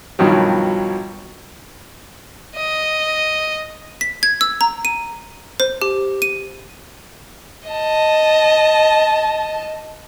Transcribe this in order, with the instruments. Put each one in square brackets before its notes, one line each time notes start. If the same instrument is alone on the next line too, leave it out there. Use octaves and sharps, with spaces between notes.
[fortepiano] G2 B2 D#3 F3 F#3
[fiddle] D#5
[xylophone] B6
G#6
E6
A#5
D#7
C5
G4
D#7
[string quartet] D#5 A5